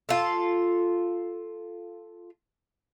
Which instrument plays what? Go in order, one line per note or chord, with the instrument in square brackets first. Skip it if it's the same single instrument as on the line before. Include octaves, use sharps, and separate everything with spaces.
[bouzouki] F4 A4